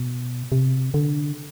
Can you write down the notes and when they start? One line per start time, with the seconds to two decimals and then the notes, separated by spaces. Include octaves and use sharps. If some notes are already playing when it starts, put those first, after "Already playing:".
Already playing: B2
0.52 C3
0.94 D3